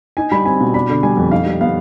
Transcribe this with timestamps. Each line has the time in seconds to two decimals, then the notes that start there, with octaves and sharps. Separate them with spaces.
0.17 D#4 G#5
0.32 G3 B5
0.45 C4 G#5
0.61 B2
0.74 D4 B5
0.89 D3
1.03 G3 G#5
1.17 F2
1.31 D#4 F5
1.46 G3
1.61 B3 F5